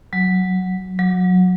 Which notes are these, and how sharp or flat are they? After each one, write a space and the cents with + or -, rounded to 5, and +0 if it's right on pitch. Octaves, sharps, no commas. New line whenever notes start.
F#3 +0
F#3 -20